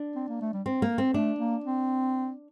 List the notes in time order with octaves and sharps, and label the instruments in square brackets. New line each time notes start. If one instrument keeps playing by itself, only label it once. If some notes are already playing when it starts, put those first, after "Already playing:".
Already playing: [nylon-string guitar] D4
[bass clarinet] C4
A#3
A3
G3
[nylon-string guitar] C4
A#3
C4
[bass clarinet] A3 [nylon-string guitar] D4
[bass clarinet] A#3
C4